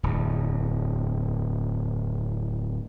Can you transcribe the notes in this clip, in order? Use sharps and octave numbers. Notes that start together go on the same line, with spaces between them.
D1 E2